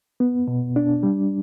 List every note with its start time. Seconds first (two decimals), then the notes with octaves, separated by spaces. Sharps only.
0.20 B3
0.47 B2
0.76 D4
1.03 G3